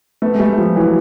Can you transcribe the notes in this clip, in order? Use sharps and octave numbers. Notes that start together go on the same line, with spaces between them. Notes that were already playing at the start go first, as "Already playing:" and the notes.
A3 B3
G#3
G3 A3
F3 G3
E3 F#3